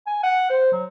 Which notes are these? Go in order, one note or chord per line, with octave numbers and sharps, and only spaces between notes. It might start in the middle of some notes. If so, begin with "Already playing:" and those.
G#5
F#5
C5
F#3